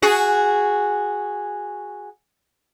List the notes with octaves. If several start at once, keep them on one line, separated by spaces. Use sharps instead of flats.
F#4 G#4